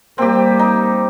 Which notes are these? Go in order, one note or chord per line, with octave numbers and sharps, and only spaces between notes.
G3 A#3 C4 G4
D#4